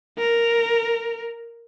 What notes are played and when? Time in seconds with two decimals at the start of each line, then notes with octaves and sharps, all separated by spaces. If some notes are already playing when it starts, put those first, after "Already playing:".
0.19 A#4